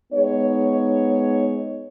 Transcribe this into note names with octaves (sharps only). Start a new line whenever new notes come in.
G#3 B3 D#4 C#5